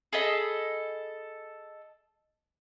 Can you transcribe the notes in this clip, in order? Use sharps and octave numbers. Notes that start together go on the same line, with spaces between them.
G#4 A4 D#5 B5